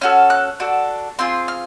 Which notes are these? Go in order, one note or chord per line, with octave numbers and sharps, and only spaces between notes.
C#4 F#4 A4 F6
F#6
D4 F#4 A4
C4 F4 G#4 C6
F6